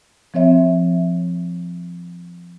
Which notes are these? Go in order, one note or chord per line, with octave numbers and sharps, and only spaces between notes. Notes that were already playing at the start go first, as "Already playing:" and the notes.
F3 C4 C#5 E5